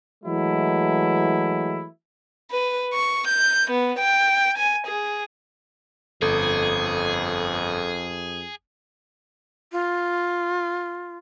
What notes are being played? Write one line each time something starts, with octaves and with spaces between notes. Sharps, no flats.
E3 F#3 G#3 A3 E4
B4
C#6
G6
B3
G5
G#5
G#4
G1 F2 G#4 A4
F4